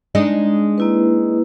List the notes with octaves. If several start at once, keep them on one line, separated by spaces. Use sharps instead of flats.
G#3 D4 D#4
A#3 E4 B4